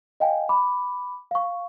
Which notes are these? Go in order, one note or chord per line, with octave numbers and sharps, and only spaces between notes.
D#5 F5 G5 G#5
B5 D6
F5 C#6